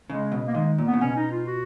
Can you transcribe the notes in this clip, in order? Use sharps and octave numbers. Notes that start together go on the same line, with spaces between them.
C#3 G#3
B2
A#3
D#3 G#3
A#2
B3
C#3
B2 C#4
D#4
F4
F#4